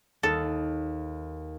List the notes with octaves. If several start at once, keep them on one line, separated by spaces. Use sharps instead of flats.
D#2 A4